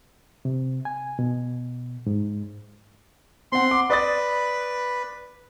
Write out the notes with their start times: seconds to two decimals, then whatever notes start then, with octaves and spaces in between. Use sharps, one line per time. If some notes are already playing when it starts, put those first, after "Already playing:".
0.45 C3
0.85 G#5
1.19 B2
2.06 G#2
3.52 C4 F#5 C6
3.71 D6
3.90 B4 D5 D#6 A6